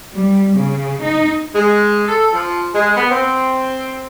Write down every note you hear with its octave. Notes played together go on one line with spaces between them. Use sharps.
G3
C#3
D#4
G#3
A4
F3
G#3
B3
C4